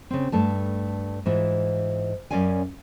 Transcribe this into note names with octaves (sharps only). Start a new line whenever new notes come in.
C#3 C4
G2 A3 A5
G#2 E3 E4 F4
F#2 F#3 C#4 D5 F5 G#5